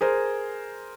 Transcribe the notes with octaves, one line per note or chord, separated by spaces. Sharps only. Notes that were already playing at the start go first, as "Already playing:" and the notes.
G#4 A#4 C5